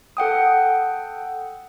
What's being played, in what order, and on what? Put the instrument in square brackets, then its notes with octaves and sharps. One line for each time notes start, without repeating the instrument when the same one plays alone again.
[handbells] A4 F#5 G5 D#6